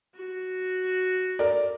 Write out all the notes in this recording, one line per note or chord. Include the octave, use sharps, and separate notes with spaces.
F#4
A#4 D5